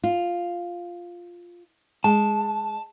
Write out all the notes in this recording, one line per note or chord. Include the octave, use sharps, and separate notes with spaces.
F4
G#3 A5